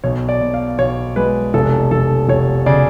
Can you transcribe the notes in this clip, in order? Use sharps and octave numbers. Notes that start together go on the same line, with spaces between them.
B1 C#5
D5
B2
F5
B1 C#5
G#3 B4
F1 A4
F1 A4
F1 C#5
C#3 D5